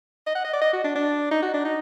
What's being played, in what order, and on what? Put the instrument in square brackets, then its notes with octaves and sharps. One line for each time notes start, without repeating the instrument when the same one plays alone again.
[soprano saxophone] D#5
F#5
D#5
D5
D#5
F#4
D4
D4
D#4
F#4
D4
D#4